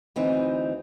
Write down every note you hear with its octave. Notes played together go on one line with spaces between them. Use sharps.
D2 E3 C4 D#4